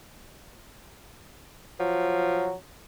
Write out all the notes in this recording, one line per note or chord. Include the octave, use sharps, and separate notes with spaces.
F3 F#3